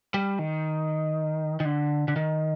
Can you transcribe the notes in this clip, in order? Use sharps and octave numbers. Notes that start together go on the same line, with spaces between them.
G3
D#3
D#3
D3
D3
D#3